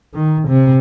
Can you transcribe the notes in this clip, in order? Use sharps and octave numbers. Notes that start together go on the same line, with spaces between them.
D#3
C3